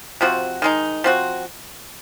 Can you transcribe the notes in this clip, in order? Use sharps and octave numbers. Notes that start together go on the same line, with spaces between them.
C3 F3 C4 F#4
D#3 G#3 D#4
F3 C4 F#4